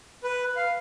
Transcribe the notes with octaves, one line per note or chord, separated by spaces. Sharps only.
B4
F5